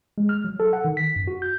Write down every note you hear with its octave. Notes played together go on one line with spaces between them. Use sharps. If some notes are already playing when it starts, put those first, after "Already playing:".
G#3
F6
F#3
A4
F#5
D#3
B6
F#2
F#4
G6